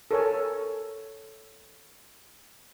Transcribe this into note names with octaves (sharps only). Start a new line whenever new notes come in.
A4 A#4 C#5 G#5